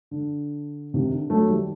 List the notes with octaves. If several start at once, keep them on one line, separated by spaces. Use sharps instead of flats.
D3
C3 D#3
D3
F#3 A3
D#3 G3